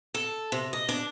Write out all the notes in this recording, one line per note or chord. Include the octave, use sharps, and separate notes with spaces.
A4
C3
D#5
D4